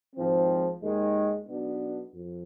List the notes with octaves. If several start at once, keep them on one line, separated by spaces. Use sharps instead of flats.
G#1 G#2 F3 C4
D#2 D#3 G#3
B1 B2 B3 D4
F2